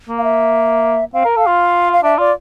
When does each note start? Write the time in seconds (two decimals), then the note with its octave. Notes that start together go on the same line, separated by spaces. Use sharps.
0.09 A#3
0.18 F5
0.24 E5
1.13 C4 F5
1.25 A#4
1.36 A4 F5
1.47 F4
1.93 F5
2.03 D4 E5
2.18 F4 D5